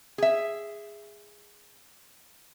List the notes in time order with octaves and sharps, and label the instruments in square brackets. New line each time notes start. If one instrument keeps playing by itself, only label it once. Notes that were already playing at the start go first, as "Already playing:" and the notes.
[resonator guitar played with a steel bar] G#4 E5